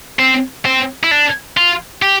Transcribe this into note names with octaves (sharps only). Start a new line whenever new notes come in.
C4
C4
E4
D4
F4
G4